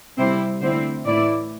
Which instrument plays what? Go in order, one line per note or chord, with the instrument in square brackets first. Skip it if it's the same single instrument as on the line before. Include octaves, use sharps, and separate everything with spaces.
[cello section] C3 G3 C4 E4 C5
D3 A3 C4 E4 C5
A2 E3 A3 E4 D5